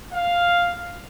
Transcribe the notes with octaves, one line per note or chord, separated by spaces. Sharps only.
F5